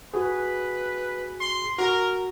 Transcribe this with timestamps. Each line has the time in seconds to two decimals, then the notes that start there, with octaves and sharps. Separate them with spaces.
0.14 F#4 G#4 B4
1.40 C6
1.79 F#4 A#4